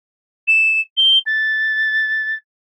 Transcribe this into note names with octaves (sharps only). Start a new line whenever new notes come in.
E7
G7
A6